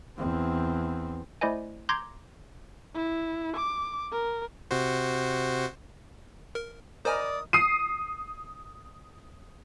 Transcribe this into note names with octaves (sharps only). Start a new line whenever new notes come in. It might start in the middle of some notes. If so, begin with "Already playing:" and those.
E2 C4
A3 E4 C5 D5 D#5 G#5
A#5 C6 D6 G6 G#6 A#6
E4
D6
A#4
C3 F#4 C5
A#4
A#4 C5 D5 D#5 G#5 B5 D#6
D#6 C7 D#7